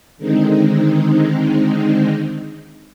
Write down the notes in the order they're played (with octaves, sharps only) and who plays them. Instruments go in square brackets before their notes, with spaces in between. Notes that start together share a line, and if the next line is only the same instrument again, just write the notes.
[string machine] D3 D#3 G#3 C4 D#4